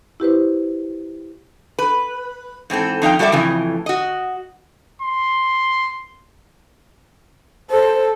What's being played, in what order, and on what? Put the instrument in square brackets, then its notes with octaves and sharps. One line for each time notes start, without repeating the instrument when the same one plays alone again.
[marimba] E4 G4 B4 C5
[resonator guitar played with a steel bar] B4
G#2 E3 C4 A4
F2 D#4 F5 G5
G3 F#4 A4 D5 E5
F2 A2 C#3 E3
F#4 D#5
[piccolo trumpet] C6
[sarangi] A4 [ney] C5